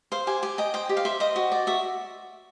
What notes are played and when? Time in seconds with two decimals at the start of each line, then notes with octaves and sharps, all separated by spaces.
0.12 C5 F5
0.27 G4 G#5
0.43 G4 G#5
0.58 D#5 G5
0.74 C5 G5
0.89 G4
0.97 F5
1.05 C5 E5
1.20 C5 D#5
1.36 F#4
1.52 D5
1.67 F#4 E5